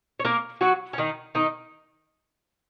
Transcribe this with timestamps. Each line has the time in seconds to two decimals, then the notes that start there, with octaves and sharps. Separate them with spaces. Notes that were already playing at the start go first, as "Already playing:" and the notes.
0.20 C#5
0.25 A#3 A#4
0.61 F#3 F#4
0.93 C#4
0.98 D#3 D#4
1.35 D#3 D#4